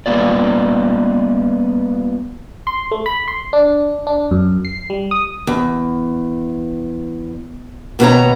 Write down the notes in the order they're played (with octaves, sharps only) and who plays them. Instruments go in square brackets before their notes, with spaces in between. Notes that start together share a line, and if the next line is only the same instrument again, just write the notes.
[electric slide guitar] G3 A#3 B3 F4 D5
[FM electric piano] C6
A3
B5
C6
D4
D4
F#2
C7
G3
D#6
[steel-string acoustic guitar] E2
D#2 B2 B3 F#4 C#5 A#5